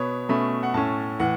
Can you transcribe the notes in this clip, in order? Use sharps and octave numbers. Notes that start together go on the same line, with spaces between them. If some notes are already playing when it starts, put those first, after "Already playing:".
Already playing: B2 B3 C#5
B2 A3 C#4 B5
F#5
A2 A3 C#4 A5
A2 E3 F#5